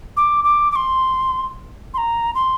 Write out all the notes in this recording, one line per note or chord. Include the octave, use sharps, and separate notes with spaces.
D6
D6
D6
C6
C6
A#5
C6